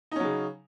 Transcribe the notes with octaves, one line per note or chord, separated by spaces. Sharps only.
C#3 F#3 C#4 D#4